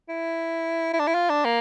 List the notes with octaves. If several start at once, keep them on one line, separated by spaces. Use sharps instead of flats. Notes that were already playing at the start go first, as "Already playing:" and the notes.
E4
E4
D4
E4
F4
D4
A#3